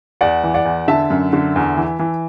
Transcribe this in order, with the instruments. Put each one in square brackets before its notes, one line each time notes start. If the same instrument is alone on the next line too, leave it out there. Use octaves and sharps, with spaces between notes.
[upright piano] E2 D5 F#5
E3
D5 F#5
E2
D3 E5 A5
F#2
D3
E2
E3
E3